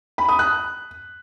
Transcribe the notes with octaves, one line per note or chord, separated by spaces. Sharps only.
B5
D#6
F#6